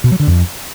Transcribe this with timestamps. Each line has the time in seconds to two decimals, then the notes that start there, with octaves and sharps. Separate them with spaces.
0.04 B2
0.12 F#3
0.20 D3
0.27 F2